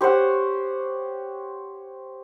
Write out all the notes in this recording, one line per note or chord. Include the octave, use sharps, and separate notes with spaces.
G4 C5 C#5 F#5